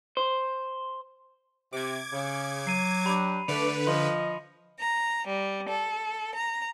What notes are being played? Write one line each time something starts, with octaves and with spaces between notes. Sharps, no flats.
C5
C3 D6 G#6
C#3
F#3 C7 D#7
D4 G4 B5
D3 A3 B4 D5 C#7 F7
F3 D#5 C6
A#5
G3
A4
A#5